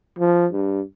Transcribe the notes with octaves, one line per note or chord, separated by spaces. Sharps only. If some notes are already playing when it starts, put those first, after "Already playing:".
F3
G2